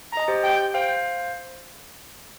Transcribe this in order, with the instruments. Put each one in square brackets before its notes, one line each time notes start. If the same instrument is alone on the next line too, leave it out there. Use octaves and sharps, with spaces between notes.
[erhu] A#5
[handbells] D#5
G4 C5
[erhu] G5
[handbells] C5 F5 [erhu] G5